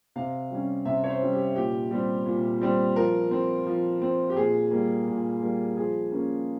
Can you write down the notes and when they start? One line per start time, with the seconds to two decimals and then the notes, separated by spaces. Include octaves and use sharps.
0.16 C3 F5
0.51 G3 C#4
0.85 C3 E5
1.04 C#5
1.09 C5
1.21 G3 C#4
1.33 G4
1.56 A#2 G4
1.91 G3 C4
2.26 A#2
2.62 G3 C4
2.96 F3 A#4
3.31 C4
3.67 F3
4.02 C4
4.30 G4
4.36 A#2 G#4
4.71 G3 A#3
5.07 A#2
5.42 G3 A#3
5.77 F3 G#4
6.12 A#3 C#4